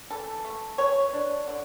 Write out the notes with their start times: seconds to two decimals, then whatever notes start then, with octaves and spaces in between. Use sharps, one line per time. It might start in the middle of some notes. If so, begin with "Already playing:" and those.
0.10 E3 A4
0.45 A3
0.78 E3 C#5
1.13 D4
1.48 D3